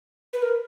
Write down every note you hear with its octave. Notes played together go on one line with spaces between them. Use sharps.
B4
A#4